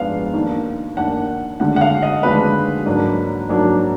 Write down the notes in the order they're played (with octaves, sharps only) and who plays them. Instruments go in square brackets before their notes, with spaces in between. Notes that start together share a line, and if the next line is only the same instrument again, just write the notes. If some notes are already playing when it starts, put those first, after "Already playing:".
Already playing: [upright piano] G#2 F3 G#3 B3 D4 F5
D#2 D#3 A#3 D4
D#2 D#3 A#3 D4 F#5
D#2 D3 G#3 D4 F#5
F#5
F5
D#5
D#2 D3 G#3 D4 B4
G#2 F#3 A#3 D4
G#2 F#3 A#3 D4